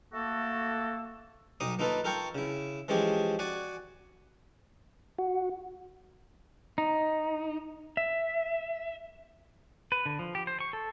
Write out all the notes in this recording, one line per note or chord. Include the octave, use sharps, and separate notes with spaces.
A3 A#3 F#4 A4
B1 D#4 D#5 D6 D#6
A#3 D#4 F4 A4 B4
F4 A4 A#4 G5 C#6
C#3 E4
E3 F3 G#3 C#4 G4 G#4
F#4 D5 F#5 G#5
F#4
D#4
E5
B4
D3
F3
G4
C5
C#6
A4